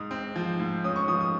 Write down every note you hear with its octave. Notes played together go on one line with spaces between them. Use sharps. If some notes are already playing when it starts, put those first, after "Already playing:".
Already playing: G#2 D#6
C4
F3
G#2
C#4 D#6
C#6
F3 D#6
D#6